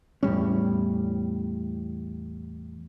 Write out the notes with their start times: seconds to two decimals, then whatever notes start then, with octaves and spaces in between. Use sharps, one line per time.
0.23 E2 A2 G3 C#4